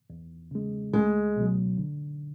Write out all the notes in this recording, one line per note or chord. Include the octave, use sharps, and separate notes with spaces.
E2
C#3 G#3
C#2 G#3
B2 F#3
D3